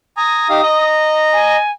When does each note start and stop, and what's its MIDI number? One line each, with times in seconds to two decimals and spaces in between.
0.17 0.48 80
0.17 0.48 82
0.17 0.94 87
0.50 0.61 63
0.50 0.61 67
0.50 0.61 77
0.63 1.56 75
0.63 1.56 82
1.33 1.72 80